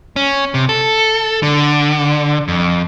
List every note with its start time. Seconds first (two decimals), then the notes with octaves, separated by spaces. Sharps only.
0.16 C#4
0.54 C3
0.69 A4
1.43 D3
2.48 F2